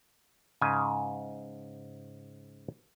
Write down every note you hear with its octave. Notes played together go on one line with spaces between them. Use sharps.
G#2 C#3 G#5